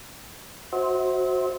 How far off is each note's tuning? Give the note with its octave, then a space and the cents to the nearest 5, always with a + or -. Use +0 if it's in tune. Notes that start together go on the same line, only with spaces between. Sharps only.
F#4 -5 C5 +10 E5 -40